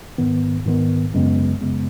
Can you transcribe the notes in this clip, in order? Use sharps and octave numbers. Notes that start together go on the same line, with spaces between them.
G#2 D#3 B3
G#2 D#3 B3
F#2 C#3 G#3 B3
F#2 C#3 G#3 B3